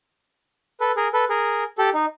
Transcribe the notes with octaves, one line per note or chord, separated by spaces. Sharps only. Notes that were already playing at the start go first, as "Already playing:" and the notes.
A4 B4
G#4 A#4
A4 B4
G#4 A#4
G4 A4
D#4